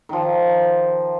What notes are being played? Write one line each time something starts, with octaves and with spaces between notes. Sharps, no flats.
D#3 F3